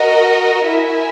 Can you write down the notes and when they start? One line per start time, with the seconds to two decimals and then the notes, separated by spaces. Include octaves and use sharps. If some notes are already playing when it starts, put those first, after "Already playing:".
Already playing: F#4 A#4 D#5
0.67 E4 A#4 E5 G#5